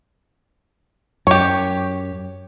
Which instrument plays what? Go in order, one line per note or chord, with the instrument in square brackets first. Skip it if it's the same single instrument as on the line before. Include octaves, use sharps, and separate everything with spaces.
[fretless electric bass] F#2 [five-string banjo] G4 C#5